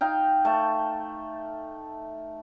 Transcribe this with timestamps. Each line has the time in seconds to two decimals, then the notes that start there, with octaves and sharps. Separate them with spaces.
0.01 D#4 F5 G5
0.45 A3 A5